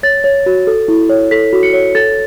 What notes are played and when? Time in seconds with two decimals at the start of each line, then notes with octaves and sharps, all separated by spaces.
0.03 C#5 A6
0.24 C#5
0.46 F#4
0.67 A4
0.88 E4
1.09 C#5
1.31 A4 B6
1.53 F#4
1.63 C#7
1.73 C#5
1.95 A4 A6